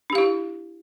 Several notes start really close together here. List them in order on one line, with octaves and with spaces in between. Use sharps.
D4 G4 F5 E4